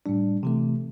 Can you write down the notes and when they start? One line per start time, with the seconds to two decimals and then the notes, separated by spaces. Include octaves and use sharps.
0.06 A2 G3 D4
0.43 C3 E3 A3